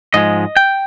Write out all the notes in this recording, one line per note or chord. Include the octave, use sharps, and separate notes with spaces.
G#2 F3 G#3 D#5
G5